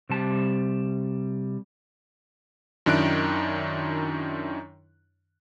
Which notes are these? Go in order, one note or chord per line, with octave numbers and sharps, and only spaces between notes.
C3 G3 A5
F#2 D#3 D4 E4 F#6 D7